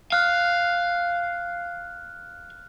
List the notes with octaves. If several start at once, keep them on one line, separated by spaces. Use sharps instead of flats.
F5 F6 F#6